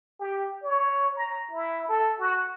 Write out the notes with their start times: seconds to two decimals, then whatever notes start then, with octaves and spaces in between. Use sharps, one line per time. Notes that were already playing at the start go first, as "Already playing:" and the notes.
0.19 G4
0.63 C#5
1.16 A#5
1.51 E4
1.88 A4
2.19 F#4